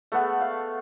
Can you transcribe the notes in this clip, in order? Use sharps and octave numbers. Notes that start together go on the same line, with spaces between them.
A3 B3 F#5
F5